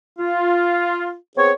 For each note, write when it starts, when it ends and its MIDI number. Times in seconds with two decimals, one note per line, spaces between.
0.19 1.13 65
1.37 1.51 59
1.37 1.51 60
1.37 1.51 68
1.37 1.51 73